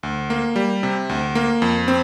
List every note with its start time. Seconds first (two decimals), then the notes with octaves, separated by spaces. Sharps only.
0.03 D2
0.30 A#3
0.56 G3
0.83 C3
1.09 D2
1.35 A#3
1.62 F2
1.88 C4